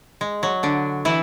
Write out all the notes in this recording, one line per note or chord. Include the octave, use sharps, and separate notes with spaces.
G#3
F#3
D3 D4
E3 E4